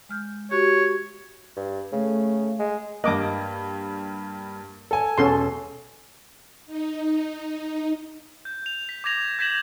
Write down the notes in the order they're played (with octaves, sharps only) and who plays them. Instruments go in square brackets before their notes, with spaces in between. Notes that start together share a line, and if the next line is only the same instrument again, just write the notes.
[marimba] G#3 F6 G6
[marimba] F#4 G4 [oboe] C#5
[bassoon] G2
[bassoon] C#3 [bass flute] A3
[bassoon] G#3
[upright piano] G2 A#3 [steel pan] D#5 D6
[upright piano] A4 G#5
[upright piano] E1 [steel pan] C#4 A4 C6
[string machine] D#4
[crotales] G6
F7
B6
D6 G#6 A#6 F7
G6 G#6 A#6 B6 E7 F#7